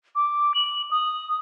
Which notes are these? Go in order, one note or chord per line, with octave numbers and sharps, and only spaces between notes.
D6
F#7
D#6